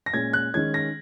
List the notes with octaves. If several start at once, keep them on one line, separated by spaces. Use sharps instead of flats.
A#6
A#2 G#3 C#4 G#6
F#6
D#3 G#3 C#4 G#6
A#6